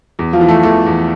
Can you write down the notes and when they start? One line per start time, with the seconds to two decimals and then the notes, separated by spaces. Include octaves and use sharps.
0.19 E2
0.33 F3 F4
0.41 E3
0.48 A3 A4
0.63 E2 A3 A4
0.86 E2